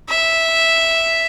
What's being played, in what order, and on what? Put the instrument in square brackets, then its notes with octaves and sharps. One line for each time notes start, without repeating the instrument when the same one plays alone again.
[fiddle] E5